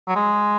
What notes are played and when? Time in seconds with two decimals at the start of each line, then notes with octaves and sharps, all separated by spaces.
0.08 F#3
0.16 G#3